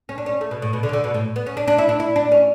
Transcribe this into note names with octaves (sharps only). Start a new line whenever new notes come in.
C#4
D4
C#4
A3
B2
A2
B2
D3
C#3
D3
B2
A2
B3
C#4
D4
D4
E4
D4
E4
D4
C#4